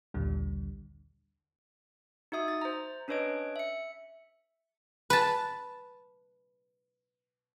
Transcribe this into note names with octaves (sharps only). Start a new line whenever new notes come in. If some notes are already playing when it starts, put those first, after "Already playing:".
A#1 D#2 A#2 D3 G3
D#4 F#4 E5 D#6
A6
C5 A#5
C#4 D4 B4 C#5 D#5 D7
E5 C#7
B4 A5